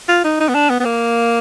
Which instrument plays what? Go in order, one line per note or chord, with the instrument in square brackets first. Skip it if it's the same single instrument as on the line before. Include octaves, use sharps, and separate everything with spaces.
[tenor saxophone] F4
D#4
D#4
B3
D4
B3
B3
A#3